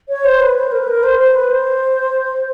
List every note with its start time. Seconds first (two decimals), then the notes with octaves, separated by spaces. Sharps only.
0.09 C#5
0.24 C5
0.40 B4
0.55 C5
0.72 A#4
0.80 B4
0.87 A#4
1.03 C5
1.19 C5
1.35 B4
1.51 C5